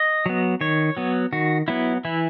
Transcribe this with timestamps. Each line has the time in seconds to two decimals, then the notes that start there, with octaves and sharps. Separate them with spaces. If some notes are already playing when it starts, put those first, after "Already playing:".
Already playing: D#5
0.26 F#3 B3
0.61 D#3 C#5
0.97 F#3 B3
1.33 D#3 F#4
1.68 F#3 B3 E4
2.05 E3 E4